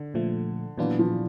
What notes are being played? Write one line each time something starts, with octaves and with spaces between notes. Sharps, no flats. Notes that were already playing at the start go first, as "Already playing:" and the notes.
Already playing: D3
A#2 F3 A3
A#2 E3 F#3 B3 D4 F4
F3